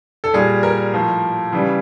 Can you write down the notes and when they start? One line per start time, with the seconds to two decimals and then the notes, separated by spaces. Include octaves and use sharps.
0.24 A4
0.33 A#2 G3 G#4
0.63 A#4
0.94 A2 F3
1.52 C#3 E3 G3